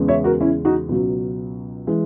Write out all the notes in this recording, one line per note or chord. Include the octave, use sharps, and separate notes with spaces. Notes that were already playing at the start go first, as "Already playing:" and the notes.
Already playing: E2 C#3 G#3
C#5 E5
F#4 A#4
C#4 E4
D#4 F#4
C#2 B2 F#3
E3 G#3